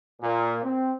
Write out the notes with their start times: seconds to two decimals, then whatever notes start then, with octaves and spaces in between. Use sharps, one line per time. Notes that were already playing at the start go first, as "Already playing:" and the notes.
0.22 A#2
0.64 C4